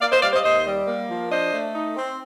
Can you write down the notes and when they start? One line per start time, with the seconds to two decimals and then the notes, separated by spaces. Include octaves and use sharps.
0.01 A#3 D5 F5
0.12 C5 D#5
0.23 G3 D5 F5
0.33 C5 D#5
0.44 D#2 C5 D#5
0.67 G3
0.88 A#3
1.10 F3
1.31 D4 C5 D#5
1.53 A3
1.75 D#4
1.97 C4